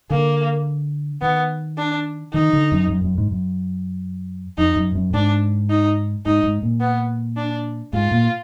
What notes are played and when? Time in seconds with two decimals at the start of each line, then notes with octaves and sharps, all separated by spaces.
0.10 D3 A#3
1.22 D#3 B3
1.77 D4
2.33 D#3 D#4
2.53 D3
2.72 F#2
2.90 F#2
3.04 F#2
3.18 G#2
3.31 F#2
4.58 F2 D#4
4.76 F#2
4.95 F#2
5.14 G#2 D4
5.70 D#4
6.26 G#2 D#4
6.44 G#2
6.63 A#2
6.81 B3
7.37 D4
7.93 G#2 F4
8.12 A#2